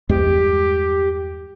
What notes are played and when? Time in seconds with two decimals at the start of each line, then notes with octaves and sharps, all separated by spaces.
0.09 E2 G2 G#3 G4